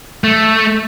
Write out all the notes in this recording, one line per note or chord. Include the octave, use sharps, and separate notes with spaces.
A3